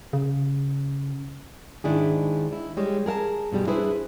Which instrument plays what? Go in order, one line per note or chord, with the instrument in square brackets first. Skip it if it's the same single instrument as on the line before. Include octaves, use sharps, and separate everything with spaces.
[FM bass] C#3
[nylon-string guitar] G#2 D#3 D4 E4 G#4
E4
G3 G#3 C#5
G#4 A#4 F5 A5
G2 B2 D#3 G3 G#3
D4 E4 G#4 B4 C5